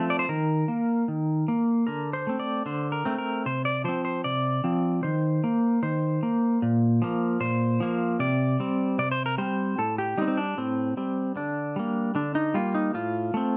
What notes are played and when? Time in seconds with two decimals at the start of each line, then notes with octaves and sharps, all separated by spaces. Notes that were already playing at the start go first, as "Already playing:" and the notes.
Already playing: F3 A3 C4 D4
0.10 D5
0.19 C5
0.29 D#3 A#4
0.68 A#3
1.08 D#3
1.48 A#3
1.87 D3 A#4
2.13 C5
2.27 A3 C4
2.39 D5
2.66 D3 C5
2.92 A#4
3.05 A3 C4
3.18 A#4
3.46 C3 C5
3.65 D5
3.84 F3 C4 C5
4.05 C5
4.24 C3 D5
4.64 F3 C4
5.03 D#3 C5
5.44 A#3
5.83 D#3 C5
6.23 A#3
6.62 A#2
7.02 F3 A#3
7.40 A#2 C5
7.80 F3 A#3
8.19 C3 D5
8.60 G3 C4
8.98 C3 D5
9.11 C5
9.26 A#4
9.38 G3 C4 C5
9.78 A2 A4
9.98 G4
10.18 G3 C4 D#4
10.28 C4
10.37 D4
10.58 A2 C4
10.97 G3 C4
11.36 D3 D4
11.76 G3 A#3
12.15 D3 D4
12.35 D#4
12.54 G3 A#3 F4
12.74 D#4
12.94 A2 F4
13.34 A3 C4